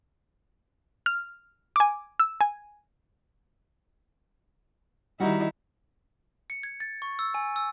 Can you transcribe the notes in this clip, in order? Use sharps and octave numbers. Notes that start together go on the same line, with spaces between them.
F6
G#5 D6
E6
G#5
D#3 G3 D#4 E4 F#4
C#7
G#6
A6
C#6
E6
G#5
E6